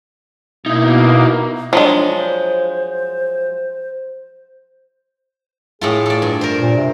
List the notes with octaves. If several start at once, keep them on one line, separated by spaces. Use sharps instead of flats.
B2 A#3 D#4 E4
F3 F#3 G#3 D4
C5
A2 A3 F4 G#4
A4 D5
G2
A#4 C5
A#2
C3